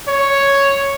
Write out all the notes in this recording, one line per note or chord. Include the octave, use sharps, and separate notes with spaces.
C#5